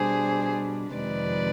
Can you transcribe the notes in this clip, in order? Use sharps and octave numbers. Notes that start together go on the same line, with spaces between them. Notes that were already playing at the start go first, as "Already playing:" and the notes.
Already playing: B2 G3 D4 G#4 C5
F2 C3 D#3 G#3 B4 D5